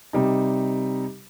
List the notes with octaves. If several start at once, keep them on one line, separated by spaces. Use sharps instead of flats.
C3 G3 D#4